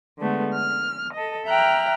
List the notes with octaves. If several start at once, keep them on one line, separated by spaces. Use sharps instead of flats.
D3 G#3 A3 B3
F6
A4 D#5
E5 G5 A#5 F6 F#6